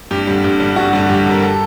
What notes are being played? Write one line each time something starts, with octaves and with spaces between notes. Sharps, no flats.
G2 G4
D3 G3
G2
D3 G3
G2 F#4
D3 G3
G2 G4
D3 G3 A#4
A4